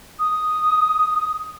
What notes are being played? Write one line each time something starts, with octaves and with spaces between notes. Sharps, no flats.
D#6